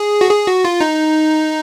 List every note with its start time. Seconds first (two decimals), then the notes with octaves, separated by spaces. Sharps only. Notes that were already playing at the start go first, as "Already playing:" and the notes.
Already playing: G#4
0.21 F#4
0.30 G#4
0.47 F#4
0.65 F4
0.81 D#4